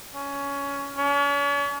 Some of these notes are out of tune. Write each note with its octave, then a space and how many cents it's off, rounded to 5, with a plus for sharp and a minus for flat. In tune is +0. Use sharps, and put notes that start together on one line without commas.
C#4 +15
C#4 +40